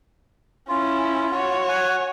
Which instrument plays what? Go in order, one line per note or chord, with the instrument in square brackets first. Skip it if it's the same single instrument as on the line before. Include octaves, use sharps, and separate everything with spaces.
[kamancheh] C#4 E4 [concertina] F4
[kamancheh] F#4 C#5
[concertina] F#5 G#5